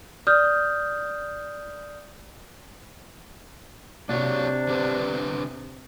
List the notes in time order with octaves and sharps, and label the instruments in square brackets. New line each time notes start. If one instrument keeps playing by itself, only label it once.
[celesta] D5 D#6 F6 G6
[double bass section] C3 [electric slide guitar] A#3 F#4 C#5 [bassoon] D4
[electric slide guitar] D3 G4 B4